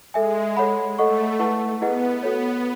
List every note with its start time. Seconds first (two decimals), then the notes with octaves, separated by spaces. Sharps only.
0.14 G#3 A4 E5 G#5
0.57 A4 C#5 F#5 B5
0.98 A3 A4 D#5 F#5 C#6
1.39 E4 B4 F#5 A5 C#6
1.81 B3 E4 G#4 B4 D#5 F#5
2.23 B3 F#4 A4 C#5